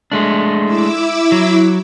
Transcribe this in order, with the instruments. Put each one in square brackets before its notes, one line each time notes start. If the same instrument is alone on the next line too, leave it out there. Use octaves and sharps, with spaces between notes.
[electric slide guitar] G#3 A3 D4
[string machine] E4 D6 E6
[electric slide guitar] F#3